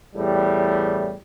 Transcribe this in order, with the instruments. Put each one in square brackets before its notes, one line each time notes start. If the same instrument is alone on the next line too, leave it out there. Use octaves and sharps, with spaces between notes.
[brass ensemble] E2 A2 G3